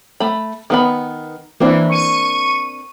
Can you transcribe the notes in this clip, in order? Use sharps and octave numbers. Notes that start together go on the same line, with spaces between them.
A3 B5
D#3 B3 B5
E3 A#3 C4 D4
C#6 D#7